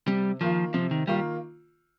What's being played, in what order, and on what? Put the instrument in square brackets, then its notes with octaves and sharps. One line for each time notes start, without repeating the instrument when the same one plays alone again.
[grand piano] C3 [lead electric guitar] G3
[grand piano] D#3 A#3 F4 [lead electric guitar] F3
[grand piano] C3 [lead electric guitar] F3
[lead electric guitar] D#3
[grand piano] D#3 A#3 F4 [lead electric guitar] G3